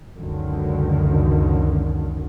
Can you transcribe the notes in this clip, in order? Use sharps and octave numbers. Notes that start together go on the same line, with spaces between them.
C#2 F#2 D3 D#3